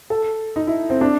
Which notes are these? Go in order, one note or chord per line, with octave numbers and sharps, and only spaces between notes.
A4
D#4
E4
C4
D4